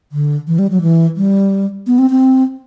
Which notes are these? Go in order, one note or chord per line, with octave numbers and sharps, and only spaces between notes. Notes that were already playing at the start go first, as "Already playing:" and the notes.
D3
E3
G3
F#3
E3
G3
B3
C4
C4